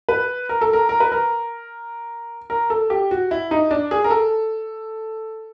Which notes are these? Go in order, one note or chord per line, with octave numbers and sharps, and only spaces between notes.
B4
A#4
A4
A#4
A#4
B4
A#4
A#4
A4
G4
F#4
E4
D#4
D4
G#4
A#4
A4